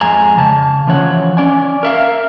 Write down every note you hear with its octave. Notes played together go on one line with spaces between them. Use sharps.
F2 G#3 G#5 A#5
C#3 A5
E3 F3 C#4 C#5 F#5
C#4 D5 G#5
A#4 E5 F5